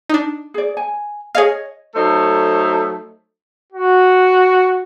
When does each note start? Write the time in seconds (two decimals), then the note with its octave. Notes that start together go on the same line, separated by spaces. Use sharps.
0.10 D4 D#4
0.54 G#4 D5
0.77 G#5
1.35 G#4 C#5 D#5 F5
1.95 F#3 A3 D#4 A4 C5
3.73 F#4